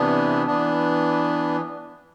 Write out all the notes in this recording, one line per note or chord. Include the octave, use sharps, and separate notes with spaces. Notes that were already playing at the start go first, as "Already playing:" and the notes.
Already playing: C3 E3 B3 D4
E3 B3 D4